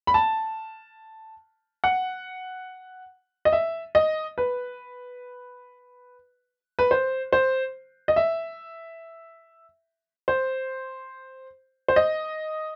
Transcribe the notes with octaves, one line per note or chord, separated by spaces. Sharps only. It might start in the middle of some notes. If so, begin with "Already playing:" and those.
B5
A5
F#5
D#5
E5
D#5
B4
B4
C5
C5
D#5
E5
C5
C5
D#5